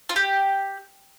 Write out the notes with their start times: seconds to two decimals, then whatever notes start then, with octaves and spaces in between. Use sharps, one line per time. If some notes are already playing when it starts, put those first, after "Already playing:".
0.09 F4
0.16 G4